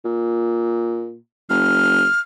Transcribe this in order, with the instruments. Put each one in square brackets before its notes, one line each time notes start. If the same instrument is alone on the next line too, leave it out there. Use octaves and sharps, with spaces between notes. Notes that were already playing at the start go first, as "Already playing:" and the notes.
[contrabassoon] A#2
[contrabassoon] F#1 [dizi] F6